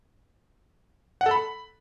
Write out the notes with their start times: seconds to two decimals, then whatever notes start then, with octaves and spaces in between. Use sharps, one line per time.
1.21 F#5
1.26 A4
1.31 B5